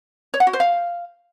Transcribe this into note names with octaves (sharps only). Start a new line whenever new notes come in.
C#5
F#5
F#4
C5
F5